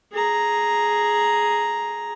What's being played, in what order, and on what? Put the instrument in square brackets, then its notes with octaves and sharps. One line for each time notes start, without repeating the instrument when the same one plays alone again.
[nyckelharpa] G#4 A#5